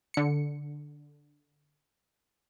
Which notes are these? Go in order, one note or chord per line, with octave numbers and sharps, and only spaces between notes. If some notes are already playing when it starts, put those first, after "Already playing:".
D3 C#7